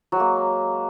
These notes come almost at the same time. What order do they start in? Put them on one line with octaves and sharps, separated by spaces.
F#3 G#3 A#3